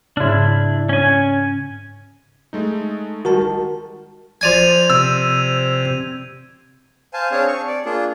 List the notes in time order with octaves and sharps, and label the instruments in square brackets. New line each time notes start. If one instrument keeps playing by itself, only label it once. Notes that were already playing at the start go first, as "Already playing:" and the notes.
[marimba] G#2 C#3 [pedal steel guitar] D4 E4
[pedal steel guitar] C#4 G#5
[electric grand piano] G#3 A3 D#4
[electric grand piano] D#3 G3 G#3 [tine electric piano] F#4 A#4 A5
[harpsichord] F3 D5 G#5 [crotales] G#6 D#7 F7
[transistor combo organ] C3 [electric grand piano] E6
[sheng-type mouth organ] C5 F5 G#5 A5
C4 D4 G#4 C#5 F5 A5
C#6
D5
A#3 D4 F4 G#4